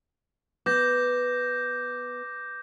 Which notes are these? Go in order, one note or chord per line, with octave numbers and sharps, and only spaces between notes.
B3 D6 G6 A#6